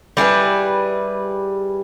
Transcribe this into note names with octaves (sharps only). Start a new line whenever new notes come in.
G3 E4 G#4 B4